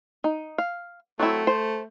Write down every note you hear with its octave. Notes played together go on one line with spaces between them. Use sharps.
D#4
F5
F#3 A3 C4 E4
C5